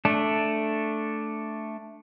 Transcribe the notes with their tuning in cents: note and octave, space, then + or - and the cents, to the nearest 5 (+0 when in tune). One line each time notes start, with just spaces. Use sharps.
A3 +0 D4 +0